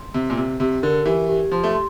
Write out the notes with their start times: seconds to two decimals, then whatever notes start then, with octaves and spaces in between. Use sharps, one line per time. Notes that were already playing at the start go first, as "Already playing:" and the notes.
Already playing: C6
0.14 C3 G4
0.30 A#2
0.37 C3 G4
0.60 C3 G4
0.83 D3 A#4
1.05 E3 G4
1.29 G4
1.51 F3 C6
1.64 A3
1.74 C6